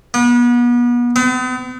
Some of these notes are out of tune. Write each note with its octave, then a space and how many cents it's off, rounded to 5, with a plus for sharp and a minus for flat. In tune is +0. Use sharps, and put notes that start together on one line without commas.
B3 -35
B3 +45